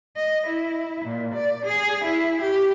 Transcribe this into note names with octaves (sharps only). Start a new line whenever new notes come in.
D#5
E4
A#2
D5
G#4
E4
G4